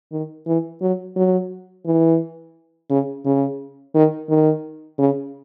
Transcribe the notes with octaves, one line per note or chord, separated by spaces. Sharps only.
D#3
E3
F#3
F#3
E3
C#3
C#3
D#3
D#3
C#3